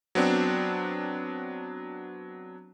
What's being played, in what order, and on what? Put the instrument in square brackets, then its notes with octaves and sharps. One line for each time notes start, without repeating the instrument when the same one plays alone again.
[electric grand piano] F#3 B3 C4 D4